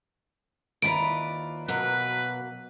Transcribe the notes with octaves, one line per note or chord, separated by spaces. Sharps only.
D#2 E4 F4 B4 D5 A#5 D7
B2 F#3 A#3 B4